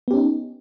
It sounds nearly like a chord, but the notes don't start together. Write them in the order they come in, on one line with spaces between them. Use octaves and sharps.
B3 G4 C#4 D#4